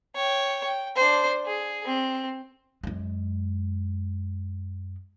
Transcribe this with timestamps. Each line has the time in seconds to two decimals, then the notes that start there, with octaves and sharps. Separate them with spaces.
0.15 C#5 G5
0.65 G5
0.96 D4 C5
1.45 G#4
1.85 C4
2.84 F#2 G#3